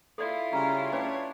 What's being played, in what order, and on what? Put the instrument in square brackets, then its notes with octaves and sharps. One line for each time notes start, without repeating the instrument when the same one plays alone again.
[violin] E4 F4 [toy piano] A4 D5
[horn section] C#3 G3 C#4 [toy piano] A#5
[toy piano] C#4 B4 G#5 [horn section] D4 C#5